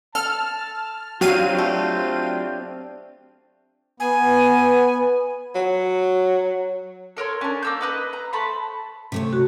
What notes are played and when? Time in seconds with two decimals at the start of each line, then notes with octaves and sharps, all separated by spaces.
0.15 A4 A5 F6
1.21 F#3 C4 D4 F4 G4 F5 G5 D#7
1.58 A3
4.00 B3 G#5
5.55 F#3
7.17 A4 A#4 C#5 C6
7.41 C#4 D4
7.63 A#3 E6 G6
7.81 D#4 B4 D#5
8.13 A#5
8.33 A3 C5 A5 B5
9.12 C3 A3 C#5
9.33 F#4